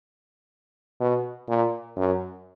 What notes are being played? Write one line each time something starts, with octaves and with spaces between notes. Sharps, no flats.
B2
A#2
F#2